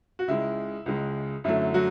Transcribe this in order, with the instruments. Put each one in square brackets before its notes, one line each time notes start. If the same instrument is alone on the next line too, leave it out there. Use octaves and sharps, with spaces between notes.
[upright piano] F#4
C#2 C#3 G#3 E4
C#2 C#3 G#3
F#2 D3 F#3 A3 E4
F#3 F#4